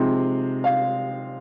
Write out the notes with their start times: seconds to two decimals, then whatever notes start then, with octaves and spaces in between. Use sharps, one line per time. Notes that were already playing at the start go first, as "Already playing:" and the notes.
Already playing: C3 F3 G#3 C4 D#4
0.64 F5